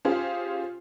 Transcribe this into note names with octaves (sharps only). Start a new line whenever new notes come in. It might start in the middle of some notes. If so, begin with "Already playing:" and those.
C#4 F4 G4 G#4 C5